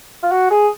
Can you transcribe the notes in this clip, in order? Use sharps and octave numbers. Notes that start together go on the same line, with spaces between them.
F4
F#4
G#4